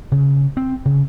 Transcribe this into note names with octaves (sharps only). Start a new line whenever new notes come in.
C#3
C4
C#3